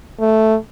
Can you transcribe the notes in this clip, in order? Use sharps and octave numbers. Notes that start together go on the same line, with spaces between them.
A3